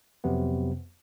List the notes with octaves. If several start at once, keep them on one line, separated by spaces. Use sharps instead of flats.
F2 C3 F#3 B3